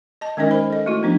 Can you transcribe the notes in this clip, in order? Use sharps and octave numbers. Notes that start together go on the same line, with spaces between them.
D#5 A5
D#3 G#3 C#4 D#4 A#4 D#5
A#4 C5 B5
A4 D#5
A3 E4 F#4
F3 B3 D4 D#4